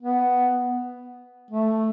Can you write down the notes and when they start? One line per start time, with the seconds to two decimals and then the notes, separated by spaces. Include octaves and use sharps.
0.02 B3
1.51 A3